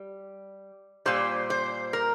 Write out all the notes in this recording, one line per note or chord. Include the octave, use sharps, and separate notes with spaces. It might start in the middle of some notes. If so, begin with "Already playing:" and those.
Already playing: G3
A#2 G3 C5
C5
A#4